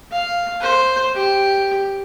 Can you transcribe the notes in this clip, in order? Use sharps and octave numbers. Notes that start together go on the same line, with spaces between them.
F5
C5
G4